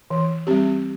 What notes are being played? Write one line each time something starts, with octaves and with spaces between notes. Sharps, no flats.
E3
G3 C4 G4